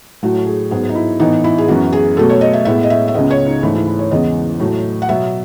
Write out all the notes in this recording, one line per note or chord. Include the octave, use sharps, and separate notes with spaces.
A2 F#3 A3 F#4
G#4
G#2 F#3 B3 G#4
D#4
E4
A2 E3 B3 D#4
E4
G#4
F#2 E3 B3 F#4
G#4
B2 F#3 A3 A4
C#5
D#5
E5
A2 G#3 B3 E5
D#5
E5
E5
C#2 C#3 G#3 B3 D#5
C#5
D#4
G#2 E3 A3 E4
E4
E4
C#5
E2 C#3 E3 G#3 B3 D#5
A2 F#3 A3
F#5
B2 F#3 B3 E5